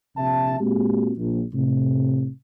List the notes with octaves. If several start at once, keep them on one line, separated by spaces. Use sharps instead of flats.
A#1 C3 E5 A5
A#2 G#3 A#3 C4 F#4 G4
A#1
A2 C3